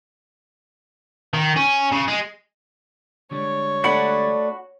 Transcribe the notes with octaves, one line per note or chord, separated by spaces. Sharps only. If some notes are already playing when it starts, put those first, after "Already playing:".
D#3
C#4
C#3
G#3
D3 G3 G#3 C#5
A3 D4 F#4 F#5 B5